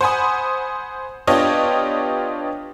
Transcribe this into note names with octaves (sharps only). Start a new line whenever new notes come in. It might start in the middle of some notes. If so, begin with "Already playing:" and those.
C5 F#5 G#5 B5 D#6
B3 D4 F4 G4 C#5 D#5